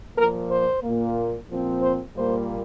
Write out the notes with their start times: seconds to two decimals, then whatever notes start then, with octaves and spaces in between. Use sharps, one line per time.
0.16 A#2 F3 A#3 A#4
0.49 C5
0.83 A#2 A#3
1.48 A#2 F3 C4
1.82 C5
2.15 A#2 G3 A#3 C5